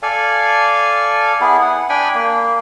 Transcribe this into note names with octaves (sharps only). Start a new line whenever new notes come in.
A4 D5 F5 G#5
B3 E4 G#4
F#5
D4 G5 G#5 B5
A#3